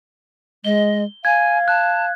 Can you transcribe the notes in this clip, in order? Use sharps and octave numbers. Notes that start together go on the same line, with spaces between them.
G#3 D#5 G7
F5 G#5 G#6
A5 F#6